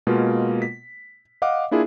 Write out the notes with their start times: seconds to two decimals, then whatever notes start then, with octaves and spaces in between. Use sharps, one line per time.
0.07 B2 G#3 A#3 F4
0.62 B6
1.42 D#5 F5 F#5 D6
1.71 A#3 D4 E4 F4 G#4